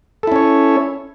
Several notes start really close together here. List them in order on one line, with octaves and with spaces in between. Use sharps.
A4 E4 C#4 C#5